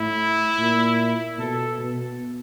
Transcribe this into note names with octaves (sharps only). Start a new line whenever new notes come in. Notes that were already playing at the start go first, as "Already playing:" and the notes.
Already playing: A2 E4
A#2
B2 A4
B2